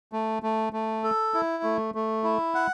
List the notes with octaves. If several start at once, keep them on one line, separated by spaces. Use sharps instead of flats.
A3
A3
A3
A4
E4
A3
A3
E4
F#5